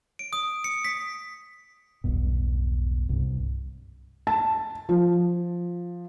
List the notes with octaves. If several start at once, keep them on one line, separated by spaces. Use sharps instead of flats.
D7
D#6
C#7
B6
E1 B1 G2 B2
C2 G2
A5
F3